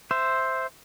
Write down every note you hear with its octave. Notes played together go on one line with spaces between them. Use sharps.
C5 E5